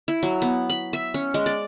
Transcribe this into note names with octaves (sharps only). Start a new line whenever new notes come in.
E4
F#3
B3
B5
E5
C#4
G#3
D5